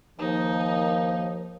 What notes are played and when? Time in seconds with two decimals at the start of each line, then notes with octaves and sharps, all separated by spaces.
0.19 D#2 F3 A#3 D#4